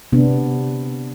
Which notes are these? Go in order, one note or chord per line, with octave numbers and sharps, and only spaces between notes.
C3 B3 D4